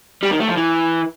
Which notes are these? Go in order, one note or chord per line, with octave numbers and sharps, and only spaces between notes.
G3
D#3
A3
F3
E3